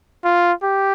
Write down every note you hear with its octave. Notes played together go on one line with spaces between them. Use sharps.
F4
G4